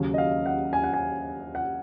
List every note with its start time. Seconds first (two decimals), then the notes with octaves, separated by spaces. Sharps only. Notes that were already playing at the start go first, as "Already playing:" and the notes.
Already playing: D#2 C#3 F#3
0.14 D#5
0.18 F5
0.46 F#5
0.73 G#5
0.84 F#5
0.94 G#5
1.55 F#5